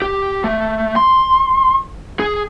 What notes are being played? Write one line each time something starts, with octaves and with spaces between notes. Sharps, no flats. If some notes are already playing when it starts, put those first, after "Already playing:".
G4
A3
C6
G#4